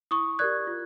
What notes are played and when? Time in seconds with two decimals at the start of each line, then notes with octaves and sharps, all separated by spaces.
0.11 E4 C#6 D#6
0.39 G4 A#4 D5 F#6 G#6
0.67 F4